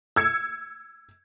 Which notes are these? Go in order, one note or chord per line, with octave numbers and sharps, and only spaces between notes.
E6 G#6 C#7